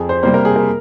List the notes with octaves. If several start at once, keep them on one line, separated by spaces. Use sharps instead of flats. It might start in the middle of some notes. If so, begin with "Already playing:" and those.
Already playing: F2 G#4
C5
C3 G3 A#3 C5
A#4
G#4
A#4